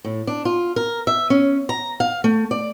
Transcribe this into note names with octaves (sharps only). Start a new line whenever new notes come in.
A2
D4
F4
A#4
E5
C#4
A#5
F5
A3
D5